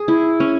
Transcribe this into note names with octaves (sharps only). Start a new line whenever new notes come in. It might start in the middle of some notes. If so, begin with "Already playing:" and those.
Already playing: G#4
E4
C#4